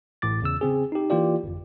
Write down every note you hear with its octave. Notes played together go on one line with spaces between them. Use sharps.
A1 A2 D6 A6
E2 C#3 E6
C#3 C4 G#4
D#4 G4
E3 A#3 F4 G4 D5
G1 F2